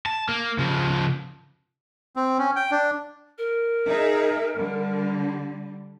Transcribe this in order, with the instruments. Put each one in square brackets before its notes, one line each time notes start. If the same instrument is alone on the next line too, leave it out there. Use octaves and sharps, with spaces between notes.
[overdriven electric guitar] A5
A#3
C#3 F3
[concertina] C4
C#4
G5
D4
[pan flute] A#4
[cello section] D#4 G#4 E5
D3 G3